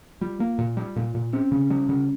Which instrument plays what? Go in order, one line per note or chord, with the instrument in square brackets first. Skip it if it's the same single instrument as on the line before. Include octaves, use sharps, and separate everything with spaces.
[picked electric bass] G3 [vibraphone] F4
[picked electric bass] A#3
A#2
G3
A#2
A#2
[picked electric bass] C4 [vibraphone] C#4
[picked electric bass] C#3
G3
C#3